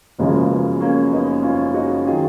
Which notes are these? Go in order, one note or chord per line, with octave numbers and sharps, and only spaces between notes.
F#1 F#2 C#3 F3 G#3 A#3
B3
A#3 C#4
B3 D#4
C#4 F4
D#4 F#4
D#3 F#3 F4 G#4